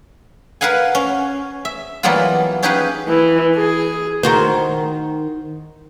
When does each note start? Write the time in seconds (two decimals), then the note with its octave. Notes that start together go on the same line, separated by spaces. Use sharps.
0.61 A#4 B4 F5 F#5 G#5
0.95 C#4
1.65 E5
2.03 E3 F#3 G3 A#3 B3 F4
2.63 C#4 D#4 G4 G#4 B4 F5
3.08 E3
3.56 G#4
4.23 D#3 F#4 C5